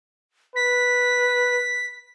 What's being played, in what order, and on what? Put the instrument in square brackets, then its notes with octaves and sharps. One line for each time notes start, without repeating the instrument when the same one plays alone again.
[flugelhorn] B4 [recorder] B6